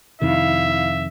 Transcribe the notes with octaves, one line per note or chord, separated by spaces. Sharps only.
F2 C3 D#3 E4 E5 F5